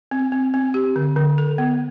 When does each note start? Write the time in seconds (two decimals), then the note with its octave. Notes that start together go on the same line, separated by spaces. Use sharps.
0.11 C4
0.32 C4
0.54 C4
0.74 G4
0.96 D3
1.16 D3
1.38 A4
1.58 B3